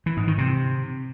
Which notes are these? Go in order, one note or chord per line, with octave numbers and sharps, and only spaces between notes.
E3
G#2
D#3
C3